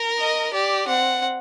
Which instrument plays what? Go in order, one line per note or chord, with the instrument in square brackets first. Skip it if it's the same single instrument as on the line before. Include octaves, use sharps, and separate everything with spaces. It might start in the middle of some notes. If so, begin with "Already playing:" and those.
Already playing: [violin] A#4
[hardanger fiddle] D#5
[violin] G4 [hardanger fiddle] D5
[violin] C4 [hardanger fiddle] F#5